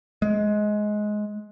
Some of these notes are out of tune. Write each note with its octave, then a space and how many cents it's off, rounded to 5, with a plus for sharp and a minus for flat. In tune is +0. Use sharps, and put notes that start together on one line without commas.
G#3 +15